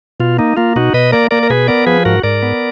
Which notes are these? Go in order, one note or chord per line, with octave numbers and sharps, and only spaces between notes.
B2 F4
A#3 D#4
A#3 F4
B2 D#4 F#4
B2 B4 D#5
A#3 A#4 D5
A#3 A#4 D5
A#4
B2 G#4 B4
B3 A#4 D5
F3 G#4 B4
G#2 F#4 A#4
G#2 A#4 D5
B3